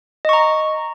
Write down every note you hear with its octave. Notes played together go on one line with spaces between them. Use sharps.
D#5 A#5 C#6